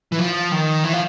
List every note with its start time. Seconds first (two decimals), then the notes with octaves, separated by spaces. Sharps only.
0.12 E3
0.19 F3
0.52 D#3
0.84 E3
0.93 F3